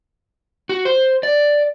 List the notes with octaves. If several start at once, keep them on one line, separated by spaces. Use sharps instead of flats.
F#4
C5
D5